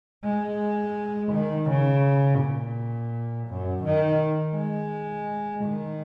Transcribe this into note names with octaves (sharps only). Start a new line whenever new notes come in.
G#3
D#3
C#3
A#2
F#2
D#3
G#3
D#3